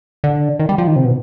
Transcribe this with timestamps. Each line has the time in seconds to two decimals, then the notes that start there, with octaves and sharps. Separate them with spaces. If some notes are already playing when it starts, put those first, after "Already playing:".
0.24 D3
0.59 D#3
0.69 G3
0.78 F3
0.87 D#3
0.96 C3
1.04 B2